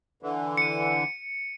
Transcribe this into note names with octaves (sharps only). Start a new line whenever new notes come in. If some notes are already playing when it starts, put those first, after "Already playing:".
D3 E3
C#7 D#7